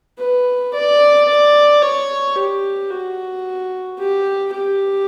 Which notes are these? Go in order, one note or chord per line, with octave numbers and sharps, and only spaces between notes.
B4
D5
D5
C#5
G4
F#4
G4
G4